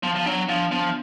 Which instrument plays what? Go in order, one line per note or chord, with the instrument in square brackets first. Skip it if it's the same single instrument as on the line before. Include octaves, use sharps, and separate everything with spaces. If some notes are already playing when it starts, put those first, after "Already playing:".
[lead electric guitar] F3 [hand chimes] B3
[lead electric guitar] F3
[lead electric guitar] F#3 [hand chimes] D4
[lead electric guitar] F3 [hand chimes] D4
[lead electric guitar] F3 [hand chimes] B3